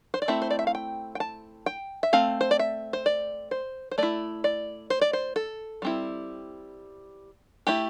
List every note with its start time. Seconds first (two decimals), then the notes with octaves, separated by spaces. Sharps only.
0.14 C5
0.22 D5
0.28 A3 C4 E4 E5
0.42 C5
0.50 D5
0.59 E5
0.67 F5
0.75 G5
1.15 G5
1.20 A5
1.66 G5
2.03 E5
2.13 A3 C4 F5
2.41 C5
2.51 D5
2.59 E5
2.93 C5
3.06 D5
3.51 C5
3.91 C5
3.98 A3 E4 D5
4.44 D5
4.90 C5
5.01 D5
5.13 C5
5.36 A4
5.82 G3 C4 E4
7.67 A3 E4 G4